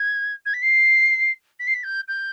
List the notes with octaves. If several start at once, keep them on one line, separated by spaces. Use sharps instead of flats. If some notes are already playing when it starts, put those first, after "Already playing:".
Already playing: G#6
G#6
B6
C7
B6
C7
B6
G6
G6